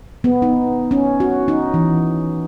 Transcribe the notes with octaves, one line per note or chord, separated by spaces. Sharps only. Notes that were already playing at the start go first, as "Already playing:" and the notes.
B3
D#4
C#4
F#4
D#4
E3